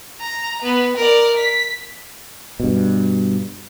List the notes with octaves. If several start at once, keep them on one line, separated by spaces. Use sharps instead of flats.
A#5
B3
A#4 D5
B6
G2 B2